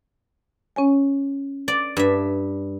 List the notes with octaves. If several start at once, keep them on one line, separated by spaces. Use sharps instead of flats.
C#4 C#5 G#5
D5
G2 E5